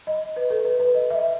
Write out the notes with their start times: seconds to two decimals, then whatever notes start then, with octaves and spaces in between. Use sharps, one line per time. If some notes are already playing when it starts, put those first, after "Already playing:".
0.07 D#5
0.36 B4
0.50 A4
0.65 B4
0.80 B4
0.94 D#5
1.10 E5
1.16 D#5